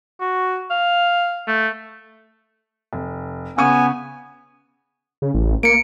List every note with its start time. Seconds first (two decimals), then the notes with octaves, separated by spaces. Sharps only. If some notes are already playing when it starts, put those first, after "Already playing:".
0.20 F#4
0.70 F5
1.47 A3
2.93 F1
3.58 C#3 B3 G#5 C#6 D#7
5.22 C#3
5.34 A1
5.63 A#3 C#7 D7